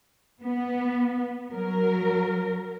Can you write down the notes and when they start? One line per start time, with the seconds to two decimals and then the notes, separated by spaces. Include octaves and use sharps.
0.42 B3
1.52 F#3 A#4